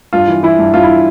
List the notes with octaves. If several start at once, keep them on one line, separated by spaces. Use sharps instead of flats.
G2 F4
E3
E3 E4
G2
G2 F4
E4
E3